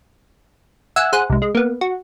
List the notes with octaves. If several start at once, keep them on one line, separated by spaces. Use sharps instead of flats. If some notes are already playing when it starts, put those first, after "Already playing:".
E5 F#5 G#5 E6
G#4 C5 F#5
C2 G#2
G#3
A#3 B3
F#4